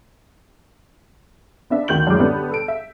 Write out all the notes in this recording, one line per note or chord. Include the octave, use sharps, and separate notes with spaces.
B3 D4 E5
D2 D#3 G6 F#7
F#2 A2 G#3 D6
D3 G3 B3 D4 A4
A4 D7
E5